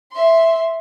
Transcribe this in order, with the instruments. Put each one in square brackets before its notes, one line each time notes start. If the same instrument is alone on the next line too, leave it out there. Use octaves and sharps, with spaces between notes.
[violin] E5 C6